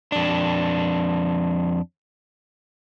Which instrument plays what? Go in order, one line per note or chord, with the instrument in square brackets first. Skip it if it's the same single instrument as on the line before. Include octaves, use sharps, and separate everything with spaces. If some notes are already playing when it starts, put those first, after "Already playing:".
[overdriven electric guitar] F2 D4